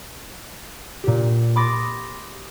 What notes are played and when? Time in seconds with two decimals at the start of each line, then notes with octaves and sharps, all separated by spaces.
1.03 A#2 G4
1.56 B5 C6 D6 D#6 A6 A#6